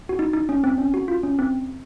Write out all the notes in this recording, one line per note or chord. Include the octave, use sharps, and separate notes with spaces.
F#4
D#4
D#4
C#4
C4
C#4
F#4
F4
C#4
C4